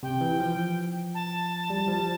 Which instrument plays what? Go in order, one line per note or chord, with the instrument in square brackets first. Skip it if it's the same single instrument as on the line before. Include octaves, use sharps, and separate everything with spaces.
[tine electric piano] C3 [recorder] G5
[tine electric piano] E3
F3
[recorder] A5
[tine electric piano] G3
F3